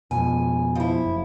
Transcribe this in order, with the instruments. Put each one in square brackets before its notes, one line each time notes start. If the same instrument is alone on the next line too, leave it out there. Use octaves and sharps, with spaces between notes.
[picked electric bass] F2 B2 [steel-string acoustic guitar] G#5
[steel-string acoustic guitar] F3 E4
[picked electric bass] F#1